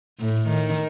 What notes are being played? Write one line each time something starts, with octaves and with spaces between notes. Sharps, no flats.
A2
D#3